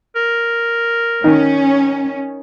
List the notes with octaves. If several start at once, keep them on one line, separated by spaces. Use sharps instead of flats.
A#4
D#3 C#4